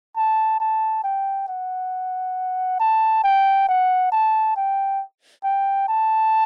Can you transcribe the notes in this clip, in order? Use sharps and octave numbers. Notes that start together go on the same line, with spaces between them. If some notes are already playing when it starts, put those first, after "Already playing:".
A5
A5
G5
F#5
A5
G5
F#5
A5
G5
G5
A5